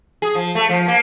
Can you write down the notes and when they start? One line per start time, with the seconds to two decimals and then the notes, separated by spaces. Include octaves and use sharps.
0.22 G#4
0.35 F3
0.55 A3
0.70 F3
0.88 A#3